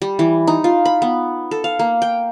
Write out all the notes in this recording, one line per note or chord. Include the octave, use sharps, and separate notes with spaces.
G3
E3
D#4
F4
B5
B3
A4
F5
A#3
G5